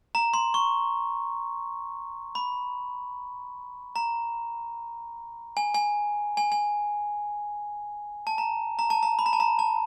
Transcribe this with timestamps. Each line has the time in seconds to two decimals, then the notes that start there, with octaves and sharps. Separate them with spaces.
0.15 A#5
0.34 C6
0.54 C#6
2.35 B5
3.96 A#5
5.57 G#5
5.74 G#5
6.37 G#5
6.52 G#5
8.27 A5
8.38 A#5
8.79 A#5
8.90 A5
9.03 A#5
9.19 B5
9.26 A#5
9.33 A5
9.40 A#5
9.59 A5